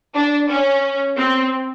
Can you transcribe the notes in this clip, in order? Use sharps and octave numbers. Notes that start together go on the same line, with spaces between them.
D4
C#4
C4